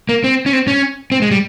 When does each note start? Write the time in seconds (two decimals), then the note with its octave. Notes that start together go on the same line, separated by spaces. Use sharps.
0.09 A#3
0.24 C4
0.46 C#4
0.53 C4
0.67 C#4
1.12 C4
1.22 G#3
1.31 G3